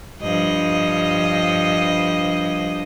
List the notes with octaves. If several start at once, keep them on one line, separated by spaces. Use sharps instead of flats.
G2 F3 D#5